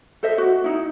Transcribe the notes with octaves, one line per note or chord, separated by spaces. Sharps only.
A4 C5 D#5 E5
F#4
D#4 E4